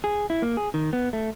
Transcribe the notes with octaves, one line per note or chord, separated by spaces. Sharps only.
G#4
E4
A#3
G#4
D#3
B3
A3